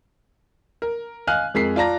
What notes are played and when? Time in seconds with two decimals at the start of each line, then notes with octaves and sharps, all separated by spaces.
0.82 A#4
1.27 D#5 F5 G#5 F6 F#6
1.54 F2 G#3 A#4 B6 C7
1.76 F4 D5 A5 A#5 A#6